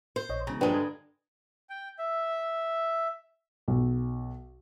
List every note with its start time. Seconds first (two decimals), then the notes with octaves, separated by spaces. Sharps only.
0.16 C5
0.29 A#1 C#5 D#5
0.47 E1 C#3 A#5
0.61 A#1 G2 G#3 D4 B4 G5
0.74 D3 A#5 D#6 G#6
1.69 G5
1.99 E5
3.68 B1